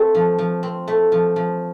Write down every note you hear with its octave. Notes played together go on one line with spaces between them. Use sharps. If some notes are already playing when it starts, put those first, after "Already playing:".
Already playing: A3 C4
F3
F3
C4
A3
F3
F3